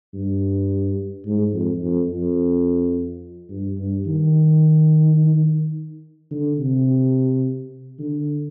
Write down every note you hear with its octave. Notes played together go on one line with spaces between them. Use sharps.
G2
G#2
F2
F2
F2
G2
G2
D#3
D3
C3
D3